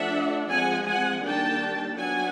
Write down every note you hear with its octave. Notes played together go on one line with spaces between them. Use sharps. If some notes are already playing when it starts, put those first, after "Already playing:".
Already playing: F3 A3 D4 E5 F#5
F3 G#3 C4 F#5 G#5
F#5 G#5
D#3 G3 A#3 D4 G5 A5
F#3 B3 D4 F#5 G#5